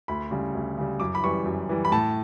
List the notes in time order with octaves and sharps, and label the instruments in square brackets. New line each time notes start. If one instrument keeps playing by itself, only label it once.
[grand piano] D2 B5
C#3 G3
D2
C#3 G3
F#2 D6
B5
E3 G3 C#6
F#2
E3 G3
B5
A2 A5